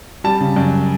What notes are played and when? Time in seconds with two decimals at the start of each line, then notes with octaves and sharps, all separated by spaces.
0.24 G3 A5
0.40 C#3
0.56 F#2